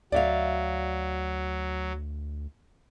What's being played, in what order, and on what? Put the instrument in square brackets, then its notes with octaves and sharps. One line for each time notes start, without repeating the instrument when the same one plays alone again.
[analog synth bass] D2 [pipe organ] F#3 [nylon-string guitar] D5 E5 F5